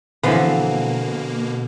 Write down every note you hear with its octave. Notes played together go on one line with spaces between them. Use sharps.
B2 D3 E3 F3 A#3 C4 F4 B4